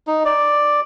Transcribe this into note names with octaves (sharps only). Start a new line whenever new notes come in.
D#4
D5